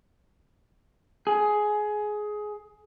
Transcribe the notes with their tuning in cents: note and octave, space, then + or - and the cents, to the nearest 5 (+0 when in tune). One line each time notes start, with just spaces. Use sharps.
G#4 +15